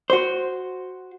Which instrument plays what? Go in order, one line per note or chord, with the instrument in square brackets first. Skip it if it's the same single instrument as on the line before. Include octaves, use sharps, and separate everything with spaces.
[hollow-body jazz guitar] F#4 C5